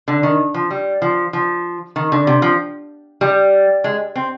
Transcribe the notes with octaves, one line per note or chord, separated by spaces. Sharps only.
D3
D#3
F3
G3
F3
F3
D#3
D3
C3
F3
G3
G#3
C4